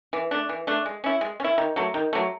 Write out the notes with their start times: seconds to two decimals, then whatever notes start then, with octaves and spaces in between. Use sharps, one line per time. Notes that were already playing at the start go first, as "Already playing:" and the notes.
0.13 E3
0.31 A3 D4
0.49 E3
0.67 A3 D4
0.86 G#3
1.04 C#4 E4
1.21 G#3
1.40 C#4
1.44 E4
1.58 D#3
1.76 F#3 A3
1.94 D#3
2.13 F#3 A3